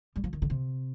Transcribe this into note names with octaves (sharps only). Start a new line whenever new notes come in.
G3
F3
D#3
D3
C3